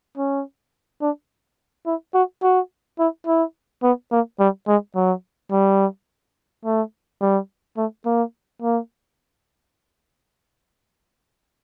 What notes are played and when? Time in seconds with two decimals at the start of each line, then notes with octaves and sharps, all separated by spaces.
0.18 C#4
1.02 D4
1.86 E4
2.14 F#4
2.43 F#4
2.99 E4
3.27 E4
3.83 B3
4.12 A#3
4.40 G3
4.68 G#3
4.96 F#3
5.52 G3
6.65 A3
7.22 G3
7.77 A3
8.06 A#3
8.62 A#3